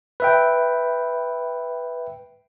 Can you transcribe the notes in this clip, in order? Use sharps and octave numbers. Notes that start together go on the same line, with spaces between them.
B4 E5 G5